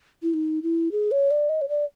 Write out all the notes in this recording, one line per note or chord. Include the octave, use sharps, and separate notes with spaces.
E4
D#4
E4
G#4
C#5
D5
D#5
C#5
D5